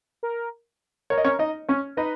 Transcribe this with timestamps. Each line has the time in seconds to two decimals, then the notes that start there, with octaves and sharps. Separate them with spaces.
0.23 A#4
1.10 A#4 C#5
1.18 D#5
1.25 C#4 C#5
1.39 D#4 D#5
1.69 C#4 C#5
1.97 D#4 B4 D#5